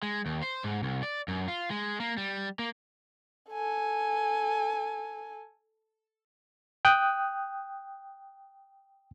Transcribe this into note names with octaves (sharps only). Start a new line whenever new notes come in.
G#3
D#2
C5
G#2
C2
D5
F#2
F4
G#3
A#3
G3
A#3
A4 G#5
G5 D#6 F#6